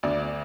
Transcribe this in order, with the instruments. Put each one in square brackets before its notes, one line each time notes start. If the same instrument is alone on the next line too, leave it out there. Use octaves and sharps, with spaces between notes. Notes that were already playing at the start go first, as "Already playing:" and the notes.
[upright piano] D2 D3 D5